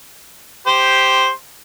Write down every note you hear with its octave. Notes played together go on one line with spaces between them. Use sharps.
G4 C5